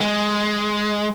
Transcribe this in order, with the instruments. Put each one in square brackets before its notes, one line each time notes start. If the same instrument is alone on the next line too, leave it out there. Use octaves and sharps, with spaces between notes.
[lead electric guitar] G#3